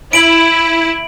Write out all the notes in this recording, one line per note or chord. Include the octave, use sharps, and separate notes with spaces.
E4 D7 F#7